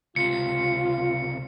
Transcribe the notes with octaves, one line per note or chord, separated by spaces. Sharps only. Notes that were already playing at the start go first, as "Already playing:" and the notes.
C#2 C3 F4 C#7